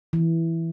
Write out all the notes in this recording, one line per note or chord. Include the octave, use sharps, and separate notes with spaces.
E3